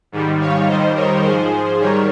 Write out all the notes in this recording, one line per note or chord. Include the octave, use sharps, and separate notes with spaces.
G#2 D#3 G3
C#5 F5
F2 D#3 G3 C5 D#5
A#4 C#5
G#2 F3 G#4 C5
G#2 D#3 G3 A#4 C#5